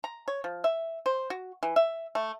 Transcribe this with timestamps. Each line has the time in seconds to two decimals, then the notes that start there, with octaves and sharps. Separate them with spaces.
0.04 A#5
0.28 C#5
0.44 F3
0.64 E5
1.06 C5
1.30 F#4
1.63 E3
1.76 E5
2.15 A3